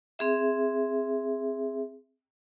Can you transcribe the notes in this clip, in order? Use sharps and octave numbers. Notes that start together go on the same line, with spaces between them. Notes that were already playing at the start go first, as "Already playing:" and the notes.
C4 G#4 E5